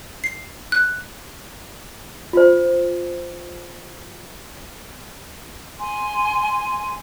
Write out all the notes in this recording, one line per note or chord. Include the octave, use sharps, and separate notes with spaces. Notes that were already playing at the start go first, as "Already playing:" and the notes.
C7
F#6
F4 C5
G#5 C6